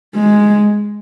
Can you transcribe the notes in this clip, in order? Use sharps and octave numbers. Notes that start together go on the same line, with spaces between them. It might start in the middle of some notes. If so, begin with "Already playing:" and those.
G#3